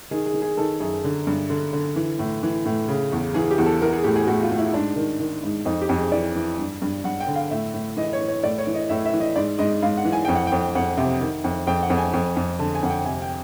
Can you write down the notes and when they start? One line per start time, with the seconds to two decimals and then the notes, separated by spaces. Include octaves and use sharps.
0.11 D#3 G#4
0.26 G#4
0.34 D#3
0.42 G#4
0.57 D#3 A4
0.80 F#2 G#4
1.04 D3
1.27 G2
1.50 D3
1.73 D3
1.96 E3
2.19 A2
2.43 E3
2.65 A2
2.88 C#3
3.12 E2
3.34 E3 G#4
3.51 G4
3.58 E2
3.66 A4
3.82 E3 A#4
3.93 G#4
4.04 A2 G4
4.16 G#4
4.27 A2 F#4
4.43 F4
4.51 A2
4.59 E4
4.74 G#2 D4
4.96 D#3
5.20 D#3
5.43 G#2
5.65 F2 D#4
5.82 G4
5.89 F2
5.96 G#4
6.12 E3 D5
6.36 E3
6.59 G2
6.82 G2
7.04 G2 F#5
7.20 G5
7.28 D3
7.36 F5
7.51 A2 E5
7.74 A2
7.97 E3 D#5
8.13 C#5
8.21 E3
8.28 C#5
8.43 A2 D5
8.58 C#5
8.67 E3
8.74 D#5
8.89 A2 E5
9.05 E5
9.13 E3
9.20 D#5
9.36 G#2 D5
9.59 G#2 D#5
9.83 G#2 F5
9.97 F#5
10.05 E3
10.12 G#5
10.25 F2 G5
10.35 F#5
10.47 F2 G5
10.75 F2 F#5
10.97 C3
11.21 D#3
11.44 F2
11.67 F2 G5
11.83 F#5
11.90 F2
11.98 G#5
12.13 F2
12.36 F2
12.59 D3 A5
12.75 G#5
12.83 F2 F#5
12.90 G5
13.05 C3 G#5
13.22 G5